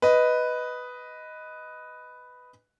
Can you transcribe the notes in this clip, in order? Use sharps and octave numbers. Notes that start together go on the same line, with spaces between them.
B4 D#5